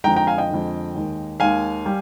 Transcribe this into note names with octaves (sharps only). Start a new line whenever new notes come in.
F2 D3 G#3 G5 A#5
G5 A#5
F5 G#5
D#5 G5
F2 D3 G#3
D#2 D#3 G#3
D#2 D#3 G#3 F5 G#5
G3